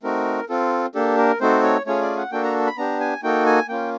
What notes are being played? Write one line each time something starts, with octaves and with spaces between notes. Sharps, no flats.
A3 C4 D#4 F#4 A#4
C4 F4 A4
A#3 D4 G4 A4
A#4
A3 C4 D#4 F#4 A4 C5
C#5
A3 C#4 F4 G#4 C#5
D5
F#5
A#3 D4 F#4 A4 G5
A#5
B5
B3 D4 G4 A#5
G#5
A#3 D#4 F#4 A4 G5
G#5
A#3 C#4 F4 G5